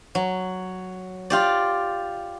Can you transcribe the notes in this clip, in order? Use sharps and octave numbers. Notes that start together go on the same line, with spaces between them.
F#3
F4 G4 D5